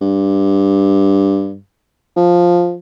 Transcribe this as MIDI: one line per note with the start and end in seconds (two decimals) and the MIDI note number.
0.01 1.58 43
2.16 2.76 53